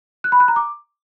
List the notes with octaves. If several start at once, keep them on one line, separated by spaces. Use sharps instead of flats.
F#6
B5
F#6
A#5
D6